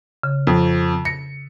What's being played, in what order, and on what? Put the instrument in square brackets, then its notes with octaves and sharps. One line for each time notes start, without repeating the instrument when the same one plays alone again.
[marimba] C#3
[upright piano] F2
[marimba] A#6 [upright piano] C#7